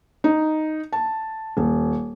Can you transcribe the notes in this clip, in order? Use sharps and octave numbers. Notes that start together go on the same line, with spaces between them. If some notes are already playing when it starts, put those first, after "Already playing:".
D#4
A5
D#1